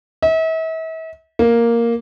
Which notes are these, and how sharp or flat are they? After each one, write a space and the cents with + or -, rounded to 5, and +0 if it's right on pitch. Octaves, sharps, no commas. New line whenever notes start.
E5 -40
A#3 +0